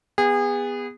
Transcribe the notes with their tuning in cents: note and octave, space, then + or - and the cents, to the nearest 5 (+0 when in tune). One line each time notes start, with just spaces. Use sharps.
B3 +0 G#4 -30